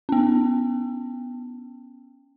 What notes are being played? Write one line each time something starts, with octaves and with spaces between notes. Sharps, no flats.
B3 C#4